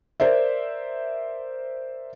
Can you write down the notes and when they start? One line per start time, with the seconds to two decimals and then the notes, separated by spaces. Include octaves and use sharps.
0.20 A#4 C5 D5 E5